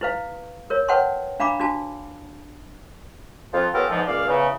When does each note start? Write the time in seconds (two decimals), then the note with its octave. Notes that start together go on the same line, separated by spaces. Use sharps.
0.01 E4 B4 F5
0.70 A#4 C#5
0.88 B4 C#5 F#5 G5 A5 C6
1.40 D4 F5 A#5 B5 D6
1.60 D4 F#4 A5
3.52 F2 F4
3.73 B3 C#4 F4 G4 A4 A#4
3.90 E2 G#2 F3
4.07 C#2 A#3 D5 F5
4.27 E2 C#3